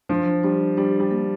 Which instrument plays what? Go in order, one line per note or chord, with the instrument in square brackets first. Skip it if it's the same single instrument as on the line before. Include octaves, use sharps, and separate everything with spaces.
[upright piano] F3 [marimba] D4
[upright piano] G3 [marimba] D4
[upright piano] G3 [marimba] D4
[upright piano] G3
[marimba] A#3